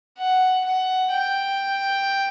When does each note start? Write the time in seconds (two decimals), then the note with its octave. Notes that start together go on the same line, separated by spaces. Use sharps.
0.19 F#5
0.65 F#5
1.11 G5